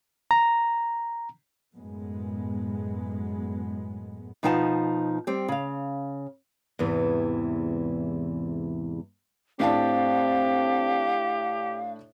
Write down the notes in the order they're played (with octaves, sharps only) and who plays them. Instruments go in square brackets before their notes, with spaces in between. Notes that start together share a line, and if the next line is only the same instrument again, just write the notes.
[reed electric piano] A#5
[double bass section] F#2 A2 G#3 B3
[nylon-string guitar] B2 F3 D#4 F#5 G5 A5
G3 C4
C#3 F5
E2 G#2 C3 E3
[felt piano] A2 D4 A5 [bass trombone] C4 [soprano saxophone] G4 [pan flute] F5